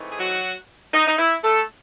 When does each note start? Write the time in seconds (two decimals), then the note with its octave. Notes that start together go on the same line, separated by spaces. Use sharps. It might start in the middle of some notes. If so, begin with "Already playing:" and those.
Already playing: G#2 E3 A3 C4 D#4
0.12 G#4
0.18 F#3 F#4
0.94 D#4
1.08 D#4
1.18 E4
1.43 A3 A4